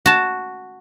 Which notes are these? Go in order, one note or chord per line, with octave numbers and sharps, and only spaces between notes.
F#4 A5